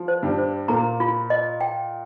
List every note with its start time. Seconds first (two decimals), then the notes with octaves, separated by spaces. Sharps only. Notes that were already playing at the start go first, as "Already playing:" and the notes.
Already playing: F3
0.08 C5
0.23 G2 G3
0.38 C5
0.68 A#2 A#3 A#5
1.00 F4
1.30 D#5
1.61 G5